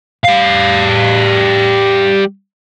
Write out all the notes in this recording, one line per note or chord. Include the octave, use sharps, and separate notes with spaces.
G3 F5